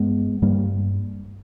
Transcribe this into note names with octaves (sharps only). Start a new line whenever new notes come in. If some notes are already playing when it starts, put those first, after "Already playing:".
Already playing: G2 G#3 B3
G2 G3 A#3